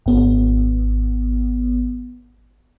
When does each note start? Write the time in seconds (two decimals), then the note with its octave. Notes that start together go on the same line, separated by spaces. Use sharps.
0.06 G#1 B3